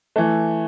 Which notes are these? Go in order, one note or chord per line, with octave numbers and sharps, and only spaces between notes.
E3 A3